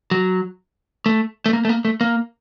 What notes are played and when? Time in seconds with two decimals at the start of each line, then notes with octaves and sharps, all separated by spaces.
0.11 F#3
1.06 A3
1.46 A3
1.53 A#3
1.65 A3
1.69 A#3
1.85 A3
2.01 A#3